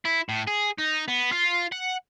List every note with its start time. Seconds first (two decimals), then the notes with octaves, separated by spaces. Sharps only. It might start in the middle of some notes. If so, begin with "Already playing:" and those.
0.05 E4
0.29 A2
0.47 G#4
0.78 D#4
1.08 B3
1.32 F4
1.72 F#5